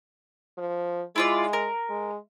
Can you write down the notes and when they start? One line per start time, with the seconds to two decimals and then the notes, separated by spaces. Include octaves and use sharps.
0.57 F3
1.16 G#3 E4 F4 D5
1.53 A#4
1.89 G#3